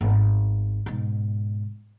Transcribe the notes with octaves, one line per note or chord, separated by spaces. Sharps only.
G#1 B3
G#2 B2